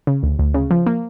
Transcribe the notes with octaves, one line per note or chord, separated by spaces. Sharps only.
C#3
D2
D2
C#3
F3
A#3